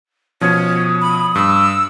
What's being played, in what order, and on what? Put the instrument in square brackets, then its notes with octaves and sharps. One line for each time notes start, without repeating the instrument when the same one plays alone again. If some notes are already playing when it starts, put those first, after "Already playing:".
[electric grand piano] B2 F3 [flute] C#4 [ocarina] D#6
[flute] B5
[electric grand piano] G2 [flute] E6